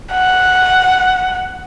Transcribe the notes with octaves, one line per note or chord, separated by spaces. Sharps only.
F#5